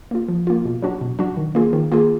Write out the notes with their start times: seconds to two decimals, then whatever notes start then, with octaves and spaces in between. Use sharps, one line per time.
0.11 A#3 F4
0.29 F3
0.47 A#3 F4
0.65 B2
0.82 F#3 D4 F#4
1.01 B2
1.19 F#3 D4 F#4
1.37 D#3
1.55 A#3 F4 G#4
1.73 D#3
1.92 A#3 F4 G#4